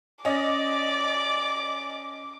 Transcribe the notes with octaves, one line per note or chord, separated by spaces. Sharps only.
C#4 D5 D#5 D6